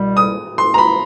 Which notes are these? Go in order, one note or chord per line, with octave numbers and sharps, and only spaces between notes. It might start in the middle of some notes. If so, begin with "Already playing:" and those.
Already playing: C2 B2 G3
D#6
C6
A#5
B5